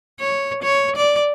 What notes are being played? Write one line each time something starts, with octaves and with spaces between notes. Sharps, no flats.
C#5
C#5
D5